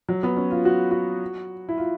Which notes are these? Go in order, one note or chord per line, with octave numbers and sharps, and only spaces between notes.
F#3
B3
C#4
F4
F#4
F#4
E4
F4